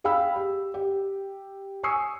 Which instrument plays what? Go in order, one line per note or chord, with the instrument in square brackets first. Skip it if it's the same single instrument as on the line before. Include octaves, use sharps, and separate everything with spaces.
[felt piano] G#4 F5 G5 B5 E6
G4
G4
G#5 C#6 D#6 E6 C7 C#7